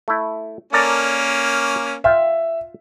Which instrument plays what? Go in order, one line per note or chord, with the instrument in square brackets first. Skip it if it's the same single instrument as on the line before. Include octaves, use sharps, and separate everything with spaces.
[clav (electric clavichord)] A3 E4
[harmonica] A#3 C#4 [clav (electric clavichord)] A4 A#4 D5
[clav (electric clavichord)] F4 G5 [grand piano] E5